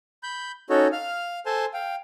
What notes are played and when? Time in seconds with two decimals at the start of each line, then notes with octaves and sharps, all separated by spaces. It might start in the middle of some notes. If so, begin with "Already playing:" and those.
0.23 B5 G6
0.70 C#4 D#4 F#4 A4 C#5
0.92 F5 F6
1.46 A4 C5 G#5 A5 C6
1.74 F5 G5